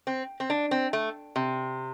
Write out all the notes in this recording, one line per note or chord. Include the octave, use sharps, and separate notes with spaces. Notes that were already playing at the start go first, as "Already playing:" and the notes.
C4
C4
D4
C4
A3
C3